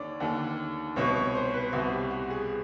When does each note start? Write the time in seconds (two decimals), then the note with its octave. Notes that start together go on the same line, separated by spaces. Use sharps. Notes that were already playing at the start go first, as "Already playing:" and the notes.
Already playing: D#2 D3 C#5 D5
0.20 D#2 D3
0.96 C2 B2 C#5
1.16 C#5
1.35 C5
1.53 B4
1.73 C2 B2 F#4
1.92 G4
2.10 F#4
2.30 G#4